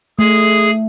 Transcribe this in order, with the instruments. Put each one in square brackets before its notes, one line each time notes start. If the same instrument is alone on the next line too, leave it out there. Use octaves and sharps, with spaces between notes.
[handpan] A3 [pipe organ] G#4